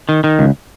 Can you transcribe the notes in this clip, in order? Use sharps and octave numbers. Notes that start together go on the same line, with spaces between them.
D#3
D#3
C#2